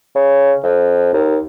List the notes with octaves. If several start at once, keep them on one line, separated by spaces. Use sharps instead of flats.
C#3
F2
D#2